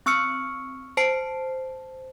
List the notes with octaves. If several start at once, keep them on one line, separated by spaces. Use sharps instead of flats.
C4 C#6 E6 F6 C#7
C5 A5 C7 D7